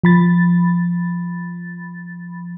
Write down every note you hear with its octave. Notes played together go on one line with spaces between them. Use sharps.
F3 B5 A6